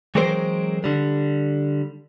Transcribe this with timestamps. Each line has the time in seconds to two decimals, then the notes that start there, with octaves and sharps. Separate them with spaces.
0.15 E3 F#3 G#3 C4 A#4 C5
0.84 D3 G3